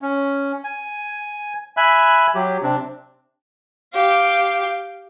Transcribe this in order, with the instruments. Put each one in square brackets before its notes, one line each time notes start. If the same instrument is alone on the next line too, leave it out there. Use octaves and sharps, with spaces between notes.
[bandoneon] C#4
G#5
E5 G#5 B5 F#6
F#3 G4
C3 C4 D4
[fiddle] G4 F5